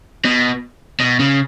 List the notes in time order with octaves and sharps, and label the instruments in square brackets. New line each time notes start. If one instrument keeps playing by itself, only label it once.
[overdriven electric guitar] B2
B2
C#3